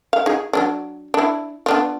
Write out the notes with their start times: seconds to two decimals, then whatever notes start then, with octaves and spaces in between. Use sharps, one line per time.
0.13 F5
0.26 D#4 G#4
0.53 F#3 C#4 D4
1.14 D4 E4
1.66 B3 D4 F4